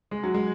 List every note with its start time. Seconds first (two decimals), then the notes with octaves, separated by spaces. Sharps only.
0.11 G#3
0.24 F#3
0.34 G#3